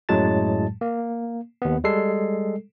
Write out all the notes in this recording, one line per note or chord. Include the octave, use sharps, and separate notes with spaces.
F#2 A2 F#3 G#3 A5 A6
A#3
D#2 B3
G3 G#3 A4 C7